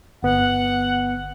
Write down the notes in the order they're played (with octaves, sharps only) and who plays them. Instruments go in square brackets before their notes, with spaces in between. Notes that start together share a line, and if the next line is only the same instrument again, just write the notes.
[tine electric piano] G1 B3 [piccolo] F#5